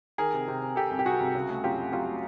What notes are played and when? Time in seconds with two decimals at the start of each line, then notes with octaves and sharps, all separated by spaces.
0.18 D#3 G#4 A#4
0.33 C3
0.48 C3
0.62 C3
0.76 C3 G4 A4
0.91 C2
0.99 G4
1.06 C3 F#4 G#4
1.21 C2
1.35 C#3
1.50 A3
1.64 F#2 F4 G4
1.78 A3
1.92 F#3 F4 G4
2.07 A3